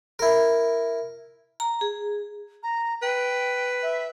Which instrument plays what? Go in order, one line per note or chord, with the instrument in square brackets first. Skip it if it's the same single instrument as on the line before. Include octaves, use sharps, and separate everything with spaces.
[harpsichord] E4 A#4
[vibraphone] A#5
G#4
[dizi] A#5
[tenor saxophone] B4 [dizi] G5
[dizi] E5